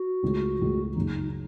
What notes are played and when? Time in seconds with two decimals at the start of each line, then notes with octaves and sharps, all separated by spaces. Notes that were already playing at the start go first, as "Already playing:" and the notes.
Already playing: F#4
0.23 C#2 C#3 A3
0.59 C#2 C#3 A3
0.96 F#1 F#2 C#3 D#4